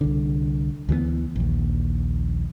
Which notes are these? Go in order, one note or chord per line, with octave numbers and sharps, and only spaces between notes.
C2 D3
D2 E3 F#3 B3
A#1 D#2